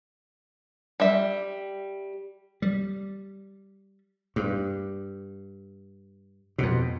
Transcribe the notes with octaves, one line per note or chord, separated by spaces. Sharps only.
G3 E5
G3
G2
F2 B2